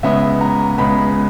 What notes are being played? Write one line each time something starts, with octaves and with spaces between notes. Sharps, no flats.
C#2 C#3 G#3 B3 E5
A#5
C#2 C#3 G#3 B3 B5